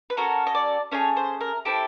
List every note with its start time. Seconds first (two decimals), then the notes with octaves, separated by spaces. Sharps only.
0.10 B4
0.17 C#4 F#4 A4 A#4
0.47 D#5
0.55 D5
0.92 A3 C#4 G#4 C#5
1.17 C5
1.41 A#4
1.65 C4 E4 G4 A4